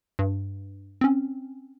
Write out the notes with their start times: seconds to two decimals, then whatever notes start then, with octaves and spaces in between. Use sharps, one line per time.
0.19 G2
1.01 C4 C#4